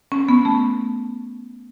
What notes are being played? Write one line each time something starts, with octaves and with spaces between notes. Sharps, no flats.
C#4
B3
A3